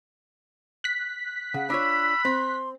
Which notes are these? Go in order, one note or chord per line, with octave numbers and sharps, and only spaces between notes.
F#6 B6
C#3 F#5
D4 F4 C#5 B5 E6
C4 C6